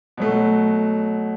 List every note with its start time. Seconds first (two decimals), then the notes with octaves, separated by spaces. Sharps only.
0.17 B2 F#3 A3